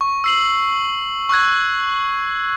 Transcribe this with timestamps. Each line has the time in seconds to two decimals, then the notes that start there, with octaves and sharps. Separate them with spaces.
0.01 C#6
0.24 E6 C7 F#7
1.29 C#6 E6 F#6 G#6